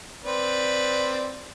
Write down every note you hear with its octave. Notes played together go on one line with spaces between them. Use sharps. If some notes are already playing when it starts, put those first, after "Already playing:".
C4 B4 D5